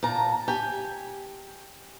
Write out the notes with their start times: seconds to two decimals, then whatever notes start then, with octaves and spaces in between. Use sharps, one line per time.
0.03 A#2 A5 A#5
0.48 G4 G#5